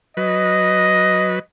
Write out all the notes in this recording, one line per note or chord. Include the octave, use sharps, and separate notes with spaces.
F#3 B4 D#5